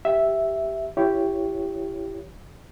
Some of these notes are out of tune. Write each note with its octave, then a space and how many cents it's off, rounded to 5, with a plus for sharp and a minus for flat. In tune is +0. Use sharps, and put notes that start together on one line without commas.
G4 +0 E5 +0
E4 +25 G4 +0 C#5 +0